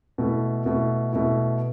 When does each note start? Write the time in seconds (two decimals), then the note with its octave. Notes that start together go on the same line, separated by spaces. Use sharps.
0.18 B2 A3 E4
0.66 B2 A3 E4
1.13 B2 A3 E4